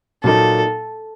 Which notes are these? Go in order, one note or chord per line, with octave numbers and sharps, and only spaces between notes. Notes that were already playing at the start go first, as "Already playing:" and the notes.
A#2 F#3 A#3 D#4 A4